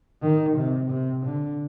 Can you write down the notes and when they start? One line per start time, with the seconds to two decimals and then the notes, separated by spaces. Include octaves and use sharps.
0.22 D#3
0.57 C3
0.91 C3
1.25 D3